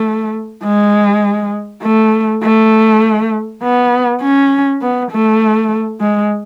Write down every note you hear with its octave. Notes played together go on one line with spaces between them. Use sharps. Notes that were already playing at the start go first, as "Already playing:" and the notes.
Already playing: A3
G#3
A3
A3
B3
C#4
B3
A3
G#3